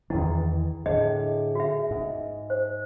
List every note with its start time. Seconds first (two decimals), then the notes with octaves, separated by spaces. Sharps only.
0.10 E2 D#3 E3 E4
0.86 A2 D3 G#4 D#5
1.55 F#4 E5
1.91 G#2
2.50 C5